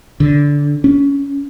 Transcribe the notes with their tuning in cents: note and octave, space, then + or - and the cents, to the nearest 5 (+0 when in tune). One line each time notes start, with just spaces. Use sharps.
D3 -15
C#4 +20